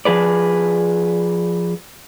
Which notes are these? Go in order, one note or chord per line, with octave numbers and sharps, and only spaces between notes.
F3 G#4 B4 D5